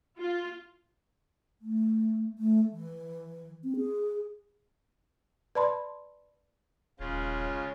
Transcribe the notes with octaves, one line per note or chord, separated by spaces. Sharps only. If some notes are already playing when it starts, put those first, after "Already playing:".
F4
A3
A3
E3
C4
G#4
B4 D5 A5 B5 C6
D#1 C#3 G#3 F4 C#5